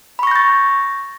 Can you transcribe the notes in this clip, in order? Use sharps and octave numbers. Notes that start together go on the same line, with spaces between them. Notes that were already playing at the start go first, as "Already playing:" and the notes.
B5 C#6 G6 A6 A#6